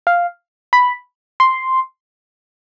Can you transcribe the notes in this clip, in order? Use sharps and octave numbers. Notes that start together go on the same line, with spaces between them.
F5
B5
C6